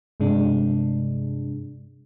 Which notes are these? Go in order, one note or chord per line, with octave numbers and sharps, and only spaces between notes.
G2 C3 G#3 D4